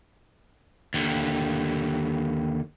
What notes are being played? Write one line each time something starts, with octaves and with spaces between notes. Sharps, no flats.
D#2 D3